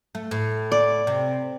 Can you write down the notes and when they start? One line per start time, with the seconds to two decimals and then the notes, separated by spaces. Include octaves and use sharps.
0.15 A3
0.31 A2
0.72 D5
1.07 C3